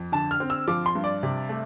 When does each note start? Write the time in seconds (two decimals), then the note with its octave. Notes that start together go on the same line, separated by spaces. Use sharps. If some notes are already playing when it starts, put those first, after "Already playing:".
Already playing: F2
0.12 D3 A5
0.31 F6
0.40 C4
0.50 E6
0.68 F3 D6
0.86 C6
0.95 G2
1.04 D5
1.23 C3
1.49 A3